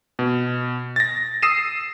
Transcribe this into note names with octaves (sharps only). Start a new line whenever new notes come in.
B2
A6 A#6
D#6 E6 C7 D#7 E7